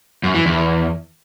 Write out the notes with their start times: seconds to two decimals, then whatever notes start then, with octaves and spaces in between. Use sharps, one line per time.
0.23 F#2
0.35 E3
0.46 E2